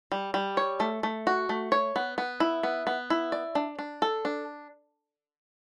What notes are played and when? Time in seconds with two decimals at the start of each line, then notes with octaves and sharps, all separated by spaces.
0.12 G3
0.34 G3
0.57 C#5
0.80 A3
1.03 A3
1.27 F#4
1.49 A3
1.72 C#5
1.96 B3
2.18 B3
2.40 E4
2.63 B3
2.87 B3
3.10 E4
3.32 D5
3.55 D4
3.79 D4
4.02 A4
4.25 D4